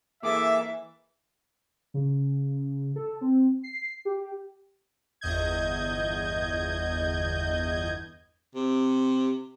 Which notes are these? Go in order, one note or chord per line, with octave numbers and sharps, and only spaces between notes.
E3 A#3 G#4 A4 E5 D6
C#3
A4
C4
C7
G4
G1 E2 D#5 G6 G#6
C3